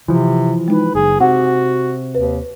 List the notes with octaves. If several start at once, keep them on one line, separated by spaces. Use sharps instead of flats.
C3 E3 F3
G#3 D#4 B4
F#1 G#4
C3 F#4 F#5
D#2 B4